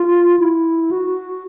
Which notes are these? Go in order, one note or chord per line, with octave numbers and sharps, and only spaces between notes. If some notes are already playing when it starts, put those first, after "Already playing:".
Already playing: F4
E4
F#4